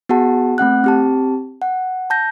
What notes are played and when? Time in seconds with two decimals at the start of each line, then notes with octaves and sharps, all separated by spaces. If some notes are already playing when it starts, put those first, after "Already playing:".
0.09 B3 F#4 G#4 F#5 A5
0.58 A3 C4 F#5 F#6
0.84 C4 G4 A5
1.62 F#5
2.10 A5 G6 A#6